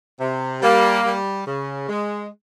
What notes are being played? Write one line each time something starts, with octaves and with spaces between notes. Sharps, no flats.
C3
G3 A#3
G3
C#3
G#3